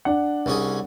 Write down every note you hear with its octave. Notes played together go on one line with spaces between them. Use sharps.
D4 F#5
C2 C#4 G#4